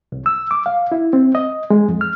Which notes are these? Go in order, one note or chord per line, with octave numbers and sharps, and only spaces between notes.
C2
E6
D6
F5
E4
C4
D#5
G#3
F2
F6